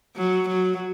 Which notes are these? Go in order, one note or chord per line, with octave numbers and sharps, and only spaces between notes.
F#3
F#3